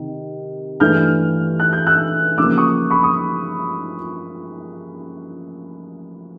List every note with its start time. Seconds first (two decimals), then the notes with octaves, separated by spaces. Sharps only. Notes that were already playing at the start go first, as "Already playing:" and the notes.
Already playing: C3 D#3
0.80 G2 E3 A3 D4 F6 G6
1.60 F#6
1.73 G6
1.86 E6 F#6
2.38 C#3 F3 A#3 D6 E6
2.57 C#6 D#6
2.90 B5 C#6
3.03 C#6 D#6